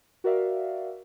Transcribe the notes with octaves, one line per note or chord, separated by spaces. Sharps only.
F#4 A#4 D5 E5 F5